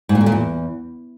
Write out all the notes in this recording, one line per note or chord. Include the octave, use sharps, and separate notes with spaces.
G#2
A#2
D3
A#2
E2